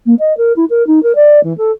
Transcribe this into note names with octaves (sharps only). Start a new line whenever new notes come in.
A#3
D#5
A#4
E4
A#4
D#4
A#4
D5
E3
A4